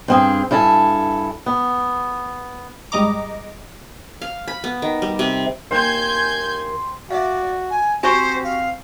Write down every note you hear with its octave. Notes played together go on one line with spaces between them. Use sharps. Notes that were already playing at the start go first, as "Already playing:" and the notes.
G2 C4 G#4
G2 E4 A4 G#5
B3
G#1 G3 G#3 D#5 A#5 D6
F5
B5
B3
D#3
G3
C3
D#2 C5 G5 G#5 G6 G#6
F#4 D5 E5 F5
G#5
C4 F#4 G4 C5 G#5 C#6
F5